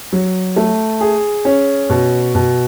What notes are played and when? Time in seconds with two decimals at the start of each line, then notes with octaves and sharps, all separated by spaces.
0.13 F#3
0.56 A3
1.01 G#4
1.45 C#4
1.90 B2
2.35 B2